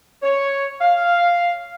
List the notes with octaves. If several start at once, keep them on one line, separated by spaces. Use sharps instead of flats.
C#5
F5